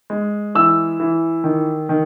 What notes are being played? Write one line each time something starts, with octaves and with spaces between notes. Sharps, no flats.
G#3
E3 E6
E3
D#3
D#3